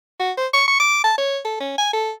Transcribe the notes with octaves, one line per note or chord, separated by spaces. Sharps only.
F#4
C5
C#6
C#6
D6
A5
C#5
A4
C#4
G#5
A4